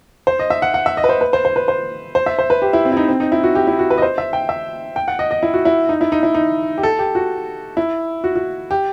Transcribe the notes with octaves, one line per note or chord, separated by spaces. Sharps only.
C5
D#5
E5
F#5
F#5
E5
D#5
B4
C5
B4
C5
C5
B4
C5
C5
E5
C5
B4
G4
E4
C4
E4
D#4
C4
D#4
E4
F#4
G4
E4
F#4
B4
D#5
C5
E5
G5
E5
G5
F#5
D#5
D#5
E4
F#4
E4
D#4
E4
D#4
E4
D#4
G4
A4
G4
F#4
E4
F#4
F#4
G4